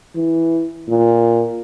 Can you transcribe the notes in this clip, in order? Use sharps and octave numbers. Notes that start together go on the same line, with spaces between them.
E3
A#2